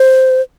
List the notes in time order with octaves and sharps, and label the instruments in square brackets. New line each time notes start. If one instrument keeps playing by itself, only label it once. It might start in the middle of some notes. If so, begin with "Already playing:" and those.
Already playing: [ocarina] C5